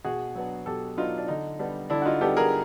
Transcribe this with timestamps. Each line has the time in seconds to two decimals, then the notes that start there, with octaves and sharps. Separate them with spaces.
0.05 B2 F#4 G#4
0.35 F#3 B3 D4
0.66 B2 G4 A4
0.97 F#3 B3 D4 D#4 F4
1.18 D4
1.28 D3 D#4
1.59 G3 B3 D4
1.90 D3 D4 E4
2.02 F#4
2.05 D#4 F4
2.21 G3 B3 D4 G4 A4
2.37 G#4 A#4